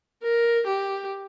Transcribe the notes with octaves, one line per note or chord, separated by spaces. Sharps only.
A#4
G4